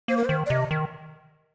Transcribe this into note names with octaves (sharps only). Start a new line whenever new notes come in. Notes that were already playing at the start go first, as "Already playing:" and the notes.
A#3 C5
A#4
C5
D#3
D5
C3 D#5
D#3